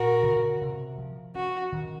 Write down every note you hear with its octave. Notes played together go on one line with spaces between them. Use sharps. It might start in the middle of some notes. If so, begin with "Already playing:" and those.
Already playing: A#2 F#4 A#4
C#3
C3
F3
C#4 F#4
D#3